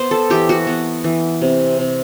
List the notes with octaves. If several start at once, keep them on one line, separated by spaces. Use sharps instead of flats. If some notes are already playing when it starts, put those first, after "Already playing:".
Already playing: B3 C5
A4
E3 G4
F#4
B3
E3
C3
C3